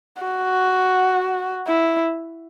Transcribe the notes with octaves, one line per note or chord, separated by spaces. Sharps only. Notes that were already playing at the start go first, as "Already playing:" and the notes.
F#4
E4